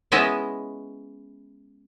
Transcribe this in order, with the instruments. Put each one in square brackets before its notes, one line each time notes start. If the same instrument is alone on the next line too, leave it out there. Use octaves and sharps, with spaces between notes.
[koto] G#3 B3 C#4 E4 D#5 E5